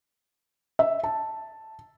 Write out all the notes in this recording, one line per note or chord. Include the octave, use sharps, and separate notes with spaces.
E5
A5